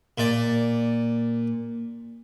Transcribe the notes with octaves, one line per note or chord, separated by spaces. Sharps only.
A#2 D5